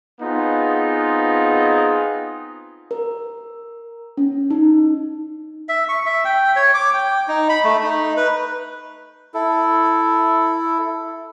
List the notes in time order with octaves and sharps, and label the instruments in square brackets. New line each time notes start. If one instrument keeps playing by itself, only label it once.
[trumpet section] B3 C4 D#4 F4 G#4
[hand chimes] A#4
C#4
D#4
[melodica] E5
C#6
E5
G5
C#5
D6
G5
D#4
B5
A3
D#4
B4
E4 A4